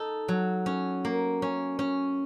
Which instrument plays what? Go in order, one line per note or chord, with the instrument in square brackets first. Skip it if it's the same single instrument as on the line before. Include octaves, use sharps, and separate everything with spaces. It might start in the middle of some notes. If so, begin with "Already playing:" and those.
Already playing: [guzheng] D#4 A4
F#3
C#4
A#3
C#4
C#4